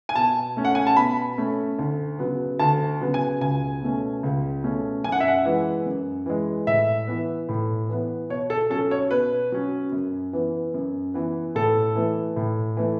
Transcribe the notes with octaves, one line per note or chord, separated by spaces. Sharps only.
G#5
B2 A5
A3 C#4
F#5
G#5
A5
B2 B5
A3 C#4
D2
C#3 F#3 B3
D2 A5
C#3 F#3 B3
G#5
C#2 G#5
B2 A3 C#4
C#2
B2 A3 C#4
F#2 G#5
F#5
E5
F#5
E3 G#3
F#2
E3 G#3
A2 E5
E3 B3
A2
E3 B3
B2 C#5
A4
F#3 C#4 A4
C#5
B2 B4
F#3 C#4
F#2
E3 B3
F#2
E3 B3
A2 A4
E3 A3
A2
E3 A3